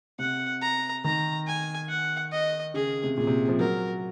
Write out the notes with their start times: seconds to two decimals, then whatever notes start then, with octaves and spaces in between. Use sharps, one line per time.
0.19 C3 F#5
0.62 A#5
1.04 D#3 A#5
1.47 G#5
1.89 F#5
2.32 D#5
2.74 C#3 G#4
3.04 C3
3.17 A#2 G#4
3.27 C3
3.49 F3
3.60 F#3 A#4